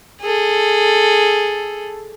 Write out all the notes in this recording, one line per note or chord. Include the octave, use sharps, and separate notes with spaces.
G#4 A4